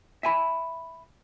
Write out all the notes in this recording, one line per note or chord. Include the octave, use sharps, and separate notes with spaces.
E5 G#5 B5